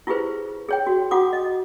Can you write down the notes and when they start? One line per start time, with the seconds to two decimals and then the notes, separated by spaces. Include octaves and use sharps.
0.07 E4 F4 G4 G#4 B4 C5
0.69 G#4 C#5 G5
0.87 F#4
1.11 F4 F#4 F#5 D6 D#6
1.33 D#5